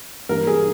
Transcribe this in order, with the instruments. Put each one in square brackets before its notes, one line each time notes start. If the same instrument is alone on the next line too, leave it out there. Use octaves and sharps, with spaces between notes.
[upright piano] G2 E3 G3 A#3 [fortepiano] A#4
[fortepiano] G#4